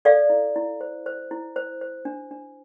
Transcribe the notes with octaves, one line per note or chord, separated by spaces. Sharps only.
A4 D5 F5
E4
E4
C5
C5
E4
C5
C5
D4
D4